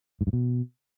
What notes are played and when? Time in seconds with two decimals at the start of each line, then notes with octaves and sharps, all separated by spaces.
0.21 G#2
0.27 G2
0.33 B2